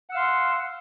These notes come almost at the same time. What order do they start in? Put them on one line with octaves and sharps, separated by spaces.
F#5 E6 F5 C6